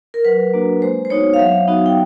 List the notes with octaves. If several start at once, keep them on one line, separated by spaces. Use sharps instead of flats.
A#4
F#3 B4
A#3 D4 F#4
G#3 C5
C5
B3 D#4 F#4 C#5
F5
F#3 E5
B3 D#4 F#4
G5